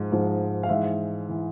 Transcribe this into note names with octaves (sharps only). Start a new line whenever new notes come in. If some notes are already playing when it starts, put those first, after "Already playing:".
Already playing: G#2 F3
G#2 F3
F5
G#2 E3 E5
E3